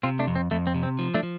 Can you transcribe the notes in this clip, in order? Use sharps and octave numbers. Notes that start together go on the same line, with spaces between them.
C3 C4 F4
A3 D4
F2
C4
F2 A3
C4
C3
C4
F3
A3 D4
F3